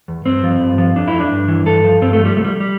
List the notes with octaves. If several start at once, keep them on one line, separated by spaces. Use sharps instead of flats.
E2
G2 C4
F3
G2
F3
F2 D4
E4
F2
D4
G2
E3
G2 A4
F3
G2 C4
A3
F3
G3
C2 A3
G3
G3